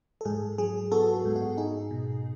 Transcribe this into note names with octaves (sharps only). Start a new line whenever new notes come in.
A4
G#2 G#4
F#3 G#4
B3 F#4 A4
F#4
G#2
F#4
D#4 G#4
B2